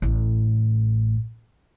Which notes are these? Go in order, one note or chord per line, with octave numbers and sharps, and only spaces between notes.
A1 A2